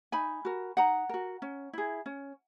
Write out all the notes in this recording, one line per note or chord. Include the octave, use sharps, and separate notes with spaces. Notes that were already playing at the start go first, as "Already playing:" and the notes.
D#4 G#5 B5
F#4 A#4
D#4 F#5 A#5
F#4 A#4
C#4
E4 G#4
C#4